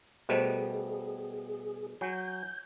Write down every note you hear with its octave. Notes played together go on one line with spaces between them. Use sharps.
B2 G3 A3 G#4 C5 D#5 A#5
F#3 G#5 G6